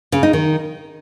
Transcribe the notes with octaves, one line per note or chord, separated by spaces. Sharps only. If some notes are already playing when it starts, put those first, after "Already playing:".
C#3
D#4
D#3